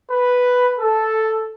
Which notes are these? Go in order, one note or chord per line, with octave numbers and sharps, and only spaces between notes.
B4
A4